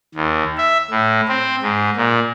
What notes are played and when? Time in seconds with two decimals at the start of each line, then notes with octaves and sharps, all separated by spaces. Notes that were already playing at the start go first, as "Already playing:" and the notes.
0.15 D#2
0.58 E5
0.91 A2
1.28 C4
1.62 G#2
1.96 A#2